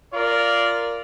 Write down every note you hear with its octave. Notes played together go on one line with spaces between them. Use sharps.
F4 A#4 D5